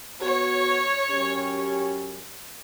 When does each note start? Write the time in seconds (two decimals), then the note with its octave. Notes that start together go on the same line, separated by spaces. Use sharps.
0.22 B3 F#4 C#5
1.11 F#2 C#4 G4